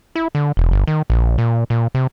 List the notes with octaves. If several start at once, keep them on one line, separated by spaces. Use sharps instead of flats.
E4
D3
E1
G1
D#3
A#1
A#2
A#2
C3